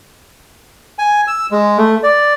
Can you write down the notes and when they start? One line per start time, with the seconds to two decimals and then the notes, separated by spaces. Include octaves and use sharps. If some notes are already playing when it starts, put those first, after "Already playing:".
0.99 G#5
1.27 E6
1.51 G#3
1.78 A3
2.03 D5